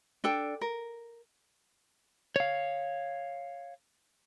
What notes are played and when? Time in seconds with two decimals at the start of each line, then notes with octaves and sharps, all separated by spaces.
0.24 D4 A4 G5
0.61 A#4
2.36 C#5 F5